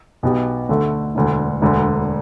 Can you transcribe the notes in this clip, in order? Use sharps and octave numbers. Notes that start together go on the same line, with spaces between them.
B1 B2 B3 G4
D2 D3 A3
E1 D2 D3
E1 D2 D3